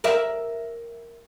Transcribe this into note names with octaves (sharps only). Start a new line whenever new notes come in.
A#4 D5 E5